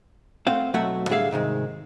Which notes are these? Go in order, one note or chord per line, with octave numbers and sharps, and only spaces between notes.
A3 C4 C5 F5 F#5
B1 F#3 A3 F#4 E5 F#5
A2 D3 G3 G#4 E5 F5
G#2 C3 D#3 G#3